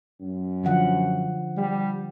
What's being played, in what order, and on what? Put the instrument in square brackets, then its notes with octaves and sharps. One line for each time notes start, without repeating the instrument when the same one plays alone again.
[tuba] F#2
[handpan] D3 F3 F#5
[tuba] G3